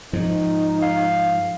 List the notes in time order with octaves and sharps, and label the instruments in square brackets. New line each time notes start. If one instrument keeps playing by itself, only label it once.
[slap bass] G#2 F3 [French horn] D#4
[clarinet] F5